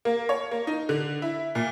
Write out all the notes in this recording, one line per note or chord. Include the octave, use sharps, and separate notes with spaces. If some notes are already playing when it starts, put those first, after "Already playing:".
A#3
C#5
A#3
D#4
D3
E4
A#2